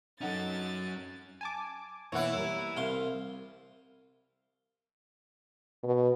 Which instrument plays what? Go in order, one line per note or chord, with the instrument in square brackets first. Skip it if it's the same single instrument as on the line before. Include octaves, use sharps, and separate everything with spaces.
[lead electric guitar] F#3 C#4 [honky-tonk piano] D#4 F#4 A4 [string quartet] A6
[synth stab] G#5 A5 D6
[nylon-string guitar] B2 A#3 [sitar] E3 E4 [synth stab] C#5 F#5
[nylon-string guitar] G3 A#4
[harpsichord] C2 F5 C6
[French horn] B2